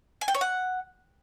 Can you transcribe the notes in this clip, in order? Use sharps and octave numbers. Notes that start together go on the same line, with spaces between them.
G#5
G5
C#5
F#5